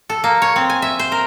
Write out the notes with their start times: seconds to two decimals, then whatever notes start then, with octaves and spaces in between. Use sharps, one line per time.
0.10 A4
0.24 A#3
0.42 C#5
0.56 C4
0.70 G#5
0.82 E5
0.99 C5
1.12 A#4